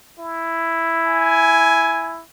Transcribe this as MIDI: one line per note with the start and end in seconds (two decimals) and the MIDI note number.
0.19 2.22 64
1.06 2.15 80